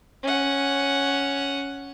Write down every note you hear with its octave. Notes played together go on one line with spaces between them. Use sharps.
C#4 F#5